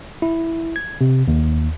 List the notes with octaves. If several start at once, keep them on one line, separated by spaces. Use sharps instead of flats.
E4
G#6
C3
D#2